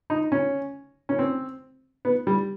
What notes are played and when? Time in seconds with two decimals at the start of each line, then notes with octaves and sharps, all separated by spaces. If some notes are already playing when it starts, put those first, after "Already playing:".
0.10 D#4
0.32 C#4
1.09 C#4
1.19 C4
2.05 B3
2.27 G3